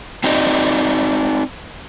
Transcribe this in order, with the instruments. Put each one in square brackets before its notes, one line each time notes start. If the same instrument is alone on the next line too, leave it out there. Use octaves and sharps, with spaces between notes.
[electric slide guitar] C4 D#4 F#4 D5 D#5